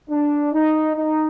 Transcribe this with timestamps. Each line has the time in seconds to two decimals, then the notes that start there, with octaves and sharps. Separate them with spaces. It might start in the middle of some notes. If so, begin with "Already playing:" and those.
0.10 D4
0.53 D#4
0.96 D#4